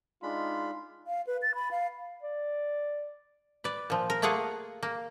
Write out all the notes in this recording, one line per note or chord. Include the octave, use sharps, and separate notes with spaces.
G#3 D4 D#4 F4 B5
F5
B4
A6
B5
F5
D5
B4 D5
A#2 F3
A#4
A3 A#3 F4 G#4 F#5
A#3